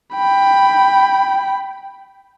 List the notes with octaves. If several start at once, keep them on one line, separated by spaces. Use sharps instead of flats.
G5 B5